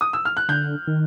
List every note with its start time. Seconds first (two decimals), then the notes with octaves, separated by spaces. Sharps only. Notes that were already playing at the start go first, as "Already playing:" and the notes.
0.01 D#6
0.13 E6
0.25 F6
0.37 F#6
0.49 D3 G6
0.87 D#3